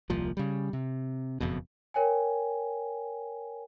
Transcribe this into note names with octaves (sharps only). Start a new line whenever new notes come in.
D#1 C2 A#2 F3
C#3 G3
C3
F#1 F2 B2
A#4 C#5 G5 G#5